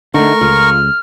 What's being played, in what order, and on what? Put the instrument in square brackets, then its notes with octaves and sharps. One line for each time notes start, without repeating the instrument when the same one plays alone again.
[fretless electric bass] D3 [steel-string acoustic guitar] A3 D#4 [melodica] A#4 C#6
[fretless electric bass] C#2 [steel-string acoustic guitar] F4 [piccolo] F6